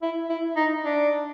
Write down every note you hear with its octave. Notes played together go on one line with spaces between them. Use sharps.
E4
E4
D#4
D4